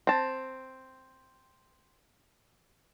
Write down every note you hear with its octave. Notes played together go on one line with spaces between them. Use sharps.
C4 A5